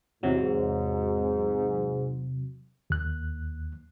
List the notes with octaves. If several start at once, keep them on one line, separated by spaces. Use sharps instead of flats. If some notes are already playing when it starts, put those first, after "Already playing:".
E2 G#2 C3 F#3
D#2 F#6